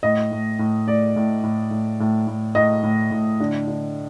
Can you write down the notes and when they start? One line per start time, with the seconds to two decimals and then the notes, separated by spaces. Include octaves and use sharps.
0.03 A2 D#5
0.32 A2
0.59 A2
0.87 A2 D5
1.16 A2
1.43 A2
1.71 A2
2.00 A2
2.27 A2
2.55 A2 D#5
2.83 A2
3.11 A2
3.40 D3
3.68 D3